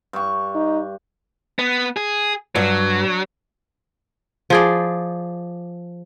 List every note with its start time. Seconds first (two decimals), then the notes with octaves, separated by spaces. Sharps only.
0.13 G2 C#6
0.55 D#4
1.59 B3
1.97 G#4
2.55 G2 F#3
4.50 F3 G#4 D5